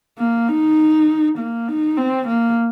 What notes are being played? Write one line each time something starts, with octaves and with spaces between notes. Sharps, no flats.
A#3
D#4
A#3
D#4
C4
A#3